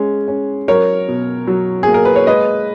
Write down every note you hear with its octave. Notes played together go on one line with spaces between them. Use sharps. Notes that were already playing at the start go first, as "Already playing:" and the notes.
Already playing: G#3 C#4
C#4
F#3 A#4 C#5
B2
F#3
A#3 G#4
A#4
B4
C#5
G#3 B4 D#5